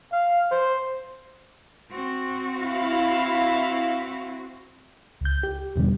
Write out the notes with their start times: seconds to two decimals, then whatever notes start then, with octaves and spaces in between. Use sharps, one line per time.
0.12 F5
0.51 C5
1.91 C4 F#4
2.58 E4 E5 F5
5.21 C#2 G6
5.43 G4
5.76 E2 B2 D3 G3